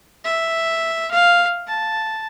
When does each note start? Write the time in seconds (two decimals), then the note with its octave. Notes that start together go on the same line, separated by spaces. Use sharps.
0.25 E5
1.11 F5
1.67 A5